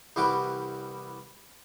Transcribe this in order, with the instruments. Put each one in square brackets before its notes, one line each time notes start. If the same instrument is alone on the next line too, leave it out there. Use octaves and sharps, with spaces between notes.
[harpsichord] C2 E3 G3 F#4 B4 D6